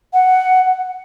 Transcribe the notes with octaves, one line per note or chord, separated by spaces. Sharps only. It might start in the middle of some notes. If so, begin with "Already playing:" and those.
F#5